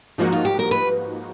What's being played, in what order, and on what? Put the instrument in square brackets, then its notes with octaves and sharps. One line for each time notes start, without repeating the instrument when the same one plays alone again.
[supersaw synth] G#2 F3 A#3 D#4 F#4
[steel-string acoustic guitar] F4
G4
A#4
B4